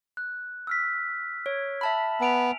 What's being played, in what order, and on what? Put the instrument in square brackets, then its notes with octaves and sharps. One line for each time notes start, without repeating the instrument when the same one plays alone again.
[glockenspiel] F#6
E6 F6 B6
[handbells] C#5
E5 A5 B5
[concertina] B3 [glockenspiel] G#5 D7 F7